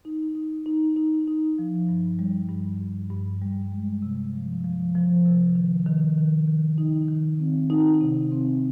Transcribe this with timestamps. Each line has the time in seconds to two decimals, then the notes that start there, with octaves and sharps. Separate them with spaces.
0.05 D#4
0.35 D#4
0.66 D#4
0.96 D#4
1.27 D#4
1.59 F3
1.89 G2
2.19 G3
2.49 G2
2.81 G2
3.11 G2
3.42 G3
3.72 G#3
4.02 C3
4.33 F3
4.64 F3
4.95 F3
5.25 C3
5.55 D#3
5.86 D#3
6.18 D#3
6.48 D#3
6.78 D#4
7.08 D#3
7.40 C4
7.70 D#4
8.01 C3
8.32 C4